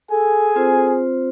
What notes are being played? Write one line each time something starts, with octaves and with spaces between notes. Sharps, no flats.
G#4 A4 G#5
C4 F4 C5